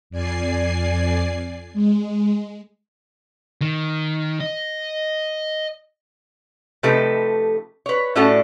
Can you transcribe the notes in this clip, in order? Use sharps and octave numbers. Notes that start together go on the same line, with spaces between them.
F2 D5 G#5 C7
G#3
D#3
D#5
C3 F3 A3 D#4 A4 B4
B4 C#5
A2 A3 C#4 D4 F#4 A4